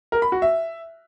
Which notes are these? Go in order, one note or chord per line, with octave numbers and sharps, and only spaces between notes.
A#4
B5
F#4
E5